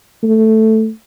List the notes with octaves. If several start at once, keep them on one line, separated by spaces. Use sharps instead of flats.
A3